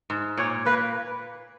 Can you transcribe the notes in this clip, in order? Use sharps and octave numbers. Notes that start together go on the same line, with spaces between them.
G#2
A#2 C#5
A#3 B4